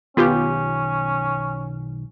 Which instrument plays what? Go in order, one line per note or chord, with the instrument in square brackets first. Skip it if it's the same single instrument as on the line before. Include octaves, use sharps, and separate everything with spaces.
[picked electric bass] B1 D#3 [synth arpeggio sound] B3 F4 G4 [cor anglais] C#4